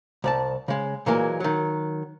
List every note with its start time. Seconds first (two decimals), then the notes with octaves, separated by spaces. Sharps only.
0.24 C2 D5 A5
0.68 C#3 G#3
1.06 A#2 E3 F#3 G#3 A#3
1.40 D#3 F#3